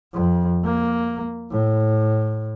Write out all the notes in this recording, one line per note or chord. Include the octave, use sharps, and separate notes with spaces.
F2
A#3
A2